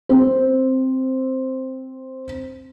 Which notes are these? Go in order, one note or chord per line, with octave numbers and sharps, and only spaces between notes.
C4 C5